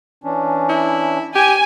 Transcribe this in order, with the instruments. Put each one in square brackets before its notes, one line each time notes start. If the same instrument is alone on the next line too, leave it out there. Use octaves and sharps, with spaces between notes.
[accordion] E3 C#4 D4
[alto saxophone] E4
[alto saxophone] G4 [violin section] G#5